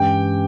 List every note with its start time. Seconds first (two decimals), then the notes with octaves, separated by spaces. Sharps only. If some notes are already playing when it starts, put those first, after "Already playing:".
Already playing: G2 E3 G#3 C#4 G4 G5